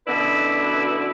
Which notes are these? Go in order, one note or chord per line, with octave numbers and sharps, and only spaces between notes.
F#2 B2 D3 E4 B4 D5